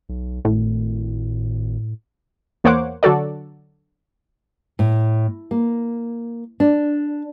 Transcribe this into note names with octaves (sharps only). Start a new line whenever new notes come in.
B1
G#1 A2
E2 A#3 C5 C#5 F#5 D6
D3 F#3 F#4 A4 D5
A2
A#3
D4